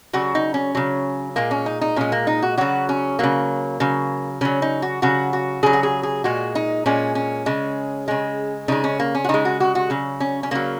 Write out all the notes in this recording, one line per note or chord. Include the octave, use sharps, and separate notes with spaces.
C#3 F#3 F#4
D#4
C#4
C#3 F#3
A#2 G#3 A#3
C#4
D#4
D#4
A#2 G#3 C#4
A#3
D#4
F#4
C#3 F#3 F#4
C#4
C#3 F#3 A#3
C#3 F#3
C#3 F#3 C#4
D#4
F#4
C#3 F#3 F#4
F#4
C#3 F#3 G#4
F#4
G#4
G#4
A#2 G#3 F#4
D#4
A#2 G#3 C#4
C#4
C#3 G#3
C#3 G#3
C#3 G#3 D#4
C#4
A#3
C#4
F#4
C#3 G#3 D#4
F#4
F#4
F#4
C#3 F#3
C#4
C#4
C#3 F#3 A#3